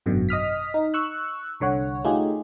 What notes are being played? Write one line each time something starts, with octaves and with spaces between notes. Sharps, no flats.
G#1 F#2 B2 D3
D#5 D#6 F6 B6
D#4
C#6 E6 F#6
C2 D3 C#5 F#5
A3 D#4 F4 G4 G#4